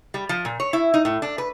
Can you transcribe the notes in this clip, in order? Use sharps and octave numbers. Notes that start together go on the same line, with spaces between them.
G3
F3
A#2
C#5
E4
D#4
A2
D4
B4